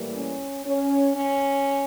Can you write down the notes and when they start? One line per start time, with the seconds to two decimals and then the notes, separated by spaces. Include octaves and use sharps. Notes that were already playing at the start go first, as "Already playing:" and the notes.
Already playing: A2 E3 G3 A#3
0.16 C#4
0.66 C#4
1.16 C#4